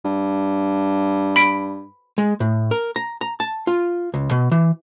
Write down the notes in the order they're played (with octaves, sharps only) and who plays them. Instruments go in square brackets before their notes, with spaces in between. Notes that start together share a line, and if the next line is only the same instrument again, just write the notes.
[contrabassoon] G2
[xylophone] B5 B6 D7
[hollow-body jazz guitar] G#3
A2
A#4
A#5
A#5
A5
F4
C#2
B2
E3